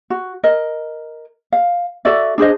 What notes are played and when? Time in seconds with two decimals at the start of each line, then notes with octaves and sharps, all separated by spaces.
0.10 F#4
0.43 A#4 D#5
1.52 F5
2.05 F#4 A4 D5 E5
2.38 D4 G#4 C5 D#5